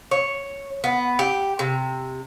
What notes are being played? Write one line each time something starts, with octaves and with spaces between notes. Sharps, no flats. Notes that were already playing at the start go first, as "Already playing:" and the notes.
C#5
B3
G4
C3